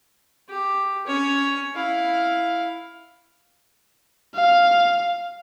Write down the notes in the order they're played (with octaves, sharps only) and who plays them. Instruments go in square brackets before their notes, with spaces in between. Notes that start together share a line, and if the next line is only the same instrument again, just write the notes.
[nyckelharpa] G4
C#4 C#5
E4 F5
[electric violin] F5